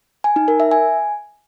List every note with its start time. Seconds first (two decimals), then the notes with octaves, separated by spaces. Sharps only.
0.24 G#5
0.36 D#4
0.48 A#4
0.60 E5
0.71 G#5